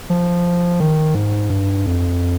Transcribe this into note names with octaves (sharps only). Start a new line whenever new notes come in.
F3
D#3
G#2
G2
F2